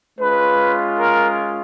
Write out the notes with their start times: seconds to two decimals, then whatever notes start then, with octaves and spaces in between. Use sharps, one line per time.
0.19 G#3 C#4 F4 B4
0.98 A#4